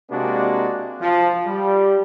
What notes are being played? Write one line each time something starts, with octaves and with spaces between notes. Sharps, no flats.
C3 G#3 A#3 D4 F#4
F3
G3